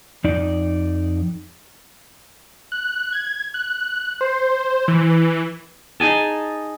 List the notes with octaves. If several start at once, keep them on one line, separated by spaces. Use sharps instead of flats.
F2 D#4 D5
F#6
G#6
F#6
C5
E3
D#4 G#4 G#5 A5